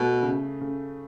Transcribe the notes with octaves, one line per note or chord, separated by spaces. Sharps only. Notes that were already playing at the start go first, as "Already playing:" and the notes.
Already playing: B2 A3
C#3
C#3